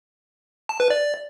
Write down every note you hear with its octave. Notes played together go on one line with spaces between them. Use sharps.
A5
B4
D5